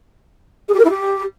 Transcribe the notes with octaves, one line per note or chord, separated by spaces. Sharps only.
G#4
G4
A#4
E4
G4